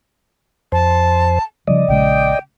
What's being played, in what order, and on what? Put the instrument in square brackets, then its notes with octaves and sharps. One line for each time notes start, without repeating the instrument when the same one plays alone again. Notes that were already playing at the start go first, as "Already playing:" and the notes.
[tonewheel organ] F2 C5 [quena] A5
[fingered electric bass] C#3 F3 G3 [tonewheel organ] D5 D#5
[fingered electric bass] A#1 C#3 G#3 [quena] G5